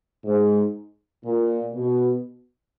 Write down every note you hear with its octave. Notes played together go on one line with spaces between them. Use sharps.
G#2
A#2
B2